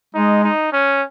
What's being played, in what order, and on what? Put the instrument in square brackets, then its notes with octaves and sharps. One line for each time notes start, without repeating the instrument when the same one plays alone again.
[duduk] G#3 [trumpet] D#4
[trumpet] D#4
C#4